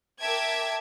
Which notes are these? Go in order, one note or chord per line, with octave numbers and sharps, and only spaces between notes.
A#4 E5 G5 A5 D6 G#6